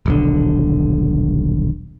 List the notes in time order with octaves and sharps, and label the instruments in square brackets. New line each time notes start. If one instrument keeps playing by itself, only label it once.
[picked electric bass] D#1 B1 D3